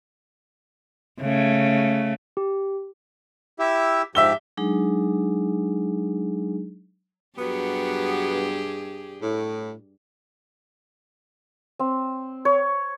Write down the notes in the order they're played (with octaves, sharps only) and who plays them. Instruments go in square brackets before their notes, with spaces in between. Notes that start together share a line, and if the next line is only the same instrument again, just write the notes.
[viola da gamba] C#3 A3
[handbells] G4
[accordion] E4 G4 E5
[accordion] G#2 F3 G4 [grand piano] E5 E6 G7
[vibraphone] F#3 G#3 D4 D#4 G#4
[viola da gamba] G2 G4 G#4 [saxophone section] F#3 B3
[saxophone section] A2
[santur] C4
C#5